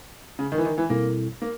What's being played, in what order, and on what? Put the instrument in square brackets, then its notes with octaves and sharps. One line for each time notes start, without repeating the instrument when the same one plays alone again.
[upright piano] C#3
D#3
E3
D#3
E3
[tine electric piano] B2 G3 C4 E4 A4 [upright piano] A#3
[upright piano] A#3